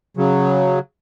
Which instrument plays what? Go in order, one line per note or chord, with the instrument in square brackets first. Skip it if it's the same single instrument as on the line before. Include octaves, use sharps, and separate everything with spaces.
[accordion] C#3 F#3